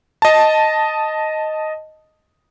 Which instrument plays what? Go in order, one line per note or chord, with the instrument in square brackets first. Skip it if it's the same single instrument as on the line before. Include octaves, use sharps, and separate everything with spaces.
[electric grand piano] D#5 A5